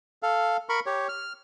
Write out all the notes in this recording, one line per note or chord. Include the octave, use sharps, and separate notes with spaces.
A4 F5
A#4 B5 C#6
G4 C#5
F6